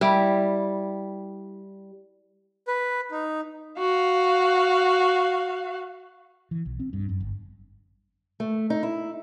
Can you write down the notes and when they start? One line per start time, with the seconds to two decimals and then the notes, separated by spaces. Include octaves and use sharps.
0.01 G3 E4
2.68 B4
3.11 D#4
3.79 F#4 F5
6.51 E3
6.65 B1
6.80 C4
6.93 G2
7.09 F#2
7.21 G1
8.40 A3
8.70 D#4
8.83 E4